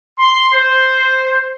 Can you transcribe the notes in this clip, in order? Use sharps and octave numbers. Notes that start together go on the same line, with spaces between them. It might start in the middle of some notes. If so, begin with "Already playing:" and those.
C6
C5